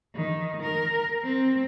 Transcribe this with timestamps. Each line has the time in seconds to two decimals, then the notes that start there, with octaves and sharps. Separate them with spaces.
0.15 D#3
0.62 A#4
1.24 C4